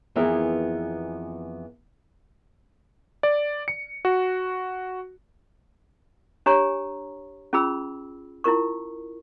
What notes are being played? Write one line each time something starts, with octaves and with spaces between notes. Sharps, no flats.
F2 E3 B3 G#4 A#4 E5
D5
C#7
F#4
D4 G4 C#5 G#5 A#5 C#6
C#4 F4 G#4 B5 E6
E4 F4 A#4 C#6